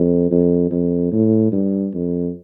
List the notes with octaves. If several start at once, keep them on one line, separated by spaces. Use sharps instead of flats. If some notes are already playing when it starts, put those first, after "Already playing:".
Already playing: F2
F2
F2
A2
G2
F2